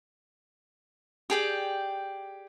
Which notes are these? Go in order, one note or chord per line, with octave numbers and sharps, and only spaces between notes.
G4 G#4 D5 G5